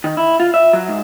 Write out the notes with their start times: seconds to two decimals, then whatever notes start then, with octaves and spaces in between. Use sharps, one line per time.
0.04 D#3
0.17 E4
0.40 F4
0.54 E5
0.73 F#3
0.89 G#2